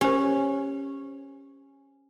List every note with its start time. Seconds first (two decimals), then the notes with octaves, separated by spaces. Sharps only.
0.01 C#4 G4 C5